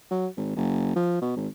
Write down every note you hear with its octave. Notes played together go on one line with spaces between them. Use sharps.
F#3
G#1
F#1
F3
B2
G#1